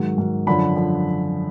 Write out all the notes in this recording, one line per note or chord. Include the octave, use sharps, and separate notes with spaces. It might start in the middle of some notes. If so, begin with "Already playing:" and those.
Already playing: G#2 D#3 F#3
G#2 D#3 F#3
F#2 D3 F3 B5
D3 F3